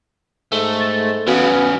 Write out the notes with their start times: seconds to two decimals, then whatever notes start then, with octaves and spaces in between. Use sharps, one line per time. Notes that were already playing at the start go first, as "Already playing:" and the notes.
0.52 G#2 A3
0.80 A6
1.27 E2 C#3 B3 F#4 F5
1.51 F6